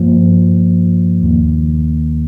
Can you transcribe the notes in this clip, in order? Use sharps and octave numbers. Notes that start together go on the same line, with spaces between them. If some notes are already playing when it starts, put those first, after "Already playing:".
Already playing: G2 F3 A#3
D#2 D#3 A#3